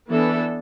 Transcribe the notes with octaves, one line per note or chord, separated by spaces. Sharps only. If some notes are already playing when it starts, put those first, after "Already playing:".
E3 B3 D4 A4